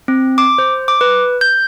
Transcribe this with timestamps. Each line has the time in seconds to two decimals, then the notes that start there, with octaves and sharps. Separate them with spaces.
0.08 C4
0.38 D6
0.58 C5
0.88 D6
1.01 B4
1.41 G6